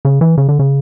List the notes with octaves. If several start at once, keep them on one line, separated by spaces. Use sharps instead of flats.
C#3
E3
C#3
D3
C#3